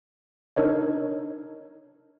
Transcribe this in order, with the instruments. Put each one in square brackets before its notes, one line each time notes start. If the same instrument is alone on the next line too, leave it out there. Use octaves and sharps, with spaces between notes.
[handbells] D4 D#4 A#4 C#5 D#5